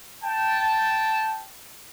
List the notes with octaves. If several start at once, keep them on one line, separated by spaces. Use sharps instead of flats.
G5 A5